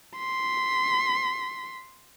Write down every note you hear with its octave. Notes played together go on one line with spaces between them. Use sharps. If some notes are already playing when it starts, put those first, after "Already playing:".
C6 B6